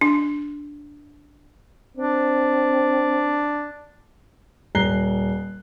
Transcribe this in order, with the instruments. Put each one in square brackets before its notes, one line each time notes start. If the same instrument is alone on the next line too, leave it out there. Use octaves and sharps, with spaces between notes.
[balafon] D4
[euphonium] C4 [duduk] D4
[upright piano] D#1 A#5 F#6 C7 G7